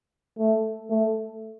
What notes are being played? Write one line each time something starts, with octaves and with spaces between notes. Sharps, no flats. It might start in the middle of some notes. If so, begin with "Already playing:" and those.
A3
A3